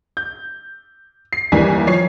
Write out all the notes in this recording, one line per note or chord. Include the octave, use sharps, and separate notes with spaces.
G6
C7
D#2 E3 G3 A#4 G#5 B6
F3 C#5 C7